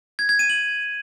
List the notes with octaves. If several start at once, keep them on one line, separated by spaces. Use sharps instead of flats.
G#6
G#6
D#7
F#7